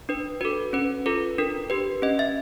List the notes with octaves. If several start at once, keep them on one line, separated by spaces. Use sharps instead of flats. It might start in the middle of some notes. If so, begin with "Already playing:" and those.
D4 B4
F#4 A4 B4
C#4 B4
F4 A4 B4
D4 A#4
G4 B4
C#4 D#5
E5